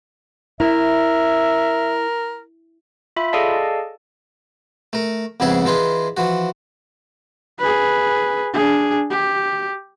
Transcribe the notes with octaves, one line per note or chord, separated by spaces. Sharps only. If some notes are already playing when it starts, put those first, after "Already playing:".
E4 A#4 E5
F4 E5 B5
G#4 A4 D5 D#5 F5 A5
A3 A#4
F2 G#2 C#3 B3 G#4 E5
E3 D#4 F4 G#4 B4
E3 F3 F#4
G#4 B4
D4 G#4
G4